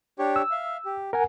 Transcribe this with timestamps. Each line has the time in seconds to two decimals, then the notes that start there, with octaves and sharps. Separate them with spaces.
0.19 D4 G4 C#5
0.36 E6
0.51 E5 F5
0.85 G4
1.13 A#4 F#5 G#5